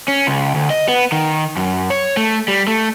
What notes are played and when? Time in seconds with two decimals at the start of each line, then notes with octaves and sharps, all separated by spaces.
0.08 C#4
0.27 C#2
0.55 D2
0.70 D#5
0.88 B3
1.12 D#3
1.56 F#2
1.90 C#5
2.17 A3
2.48 G3
2.67 A3